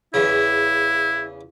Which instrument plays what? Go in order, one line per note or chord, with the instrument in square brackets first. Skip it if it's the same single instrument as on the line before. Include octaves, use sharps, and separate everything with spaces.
[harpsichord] E2 C#3 [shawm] E4